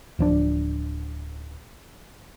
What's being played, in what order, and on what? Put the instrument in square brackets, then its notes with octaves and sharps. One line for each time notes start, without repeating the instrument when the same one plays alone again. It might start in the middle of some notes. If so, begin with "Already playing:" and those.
[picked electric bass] D1 F3 D4